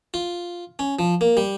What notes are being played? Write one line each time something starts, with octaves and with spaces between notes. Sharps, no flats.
F4
C#4
F3
A#3
G3